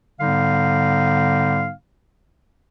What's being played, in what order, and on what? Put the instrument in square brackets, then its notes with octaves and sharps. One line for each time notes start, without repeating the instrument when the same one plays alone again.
[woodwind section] G#2 D3 G3 B3 D#4 F5